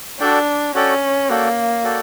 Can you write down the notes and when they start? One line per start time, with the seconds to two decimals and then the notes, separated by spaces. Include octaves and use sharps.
0.20 D4 F#4 A4 D5 G5
0.75 C#4 F#4 A4 D5 G5
1.29 A#3 F#4 A4 D5 G5
1.84 F#4 A4 D5 G5